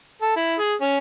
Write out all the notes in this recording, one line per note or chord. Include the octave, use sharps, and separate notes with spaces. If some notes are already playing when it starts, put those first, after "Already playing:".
A4
E4
G#4
C#4